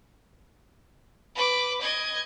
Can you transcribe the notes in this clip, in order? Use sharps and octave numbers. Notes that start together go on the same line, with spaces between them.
B4 D6
D#5 G#6